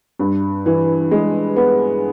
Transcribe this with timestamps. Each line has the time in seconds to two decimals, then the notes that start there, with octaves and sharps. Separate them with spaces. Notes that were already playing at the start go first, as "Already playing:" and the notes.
0.19 G2
0.66 E3
1.11 G#3
1.56 B3